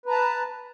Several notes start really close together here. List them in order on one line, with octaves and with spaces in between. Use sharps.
B4 A#5 A5